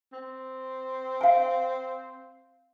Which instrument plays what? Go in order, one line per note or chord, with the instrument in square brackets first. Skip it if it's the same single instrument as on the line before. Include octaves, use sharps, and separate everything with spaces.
[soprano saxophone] C4
[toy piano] F5 G#5